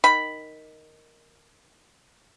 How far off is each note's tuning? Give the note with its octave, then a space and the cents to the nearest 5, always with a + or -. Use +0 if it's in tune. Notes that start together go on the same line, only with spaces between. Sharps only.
D#3 +0 B5 +5